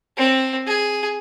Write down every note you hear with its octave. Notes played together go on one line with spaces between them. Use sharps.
C4
G#4